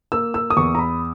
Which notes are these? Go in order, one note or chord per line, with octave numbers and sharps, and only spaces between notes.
A#3 E6
E6
D#6
E2 C#6
A#5
B5